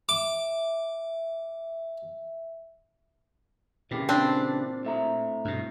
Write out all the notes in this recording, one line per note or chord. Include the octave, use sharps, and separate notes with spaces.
E5 D6
A#2 C#3 E3 G4
C4 D4
A2 E5 A#5
G2 B2